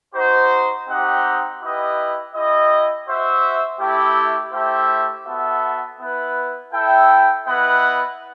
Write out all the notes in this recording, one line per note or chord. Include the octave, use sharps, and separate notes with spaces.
D#4 F#4 C5
C4 D#4 G4 D#5 F#5
E4 G4 B4 D#5
E4 G4 D#5
F#4 C5 E5
A3 E4 G4
A3 E4 G4 C5 E5
B3 F#4 A4 E5
B3 E4 B4
E4 A4 E5 G5
B3 E4 B4 D#5 F#5